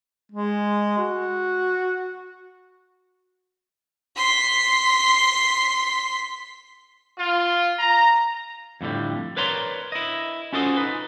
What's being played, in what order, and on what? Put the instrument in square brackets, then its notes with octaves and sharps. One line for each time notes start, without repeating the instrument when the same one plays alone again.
[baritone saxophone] G#3
F#4
[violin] C6 B6
[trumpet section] F4
A#5
[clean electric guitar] F2 A2 D3 G3
A#4 B4 C#5 D5 A#5 C6
E4 D#5
C#4 F4 F#4 A4 C5 D#5
D#4 B4